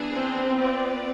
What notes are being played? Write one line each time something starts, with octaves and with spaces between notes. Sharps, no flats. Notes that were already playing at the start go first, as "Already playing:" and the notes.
Already playing: E3 B3 D4 G#4
C4
B3 F4 B4 D5